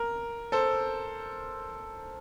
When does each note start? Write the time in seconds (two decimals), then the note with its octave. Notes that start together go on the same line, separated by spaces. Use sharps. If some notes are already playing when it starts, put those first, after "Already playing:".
Already playing: A#4
0.52 A4 C5